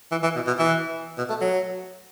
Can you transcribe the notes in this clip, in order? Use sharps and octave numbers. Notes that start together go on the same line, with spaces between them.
E3
E3
B2
B2
E3
B2
A3
F#3